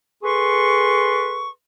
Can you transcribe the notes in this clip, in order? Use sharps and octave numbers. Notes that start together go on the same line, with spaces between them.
G#4 A4 B4 C6 C#6